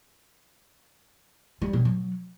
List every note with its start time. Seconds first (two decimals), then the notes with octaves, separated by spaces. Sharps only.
1.62 G3
1.73 B2
1.85 F#3